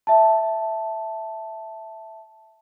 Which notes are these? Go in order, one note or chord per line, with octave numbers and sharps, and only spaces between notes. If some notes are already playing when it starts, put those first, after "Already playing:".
E5 A5